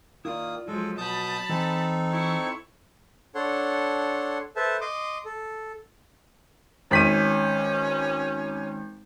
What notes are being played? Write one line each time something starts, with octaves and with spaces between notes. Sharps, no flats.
D#3 A#3 E4 F4 D5 D#6
F3 F#3 G#3 A4
B2 A5 B5 D#6 G6
E3 C4 D#4 A4 G#5
E4 C#6
D4 A4 C#5 F#5 C6
A4 B4 C5 E5 A5
D#5 C6 D6 D#6
A4
G#1 C#4 B6 D#7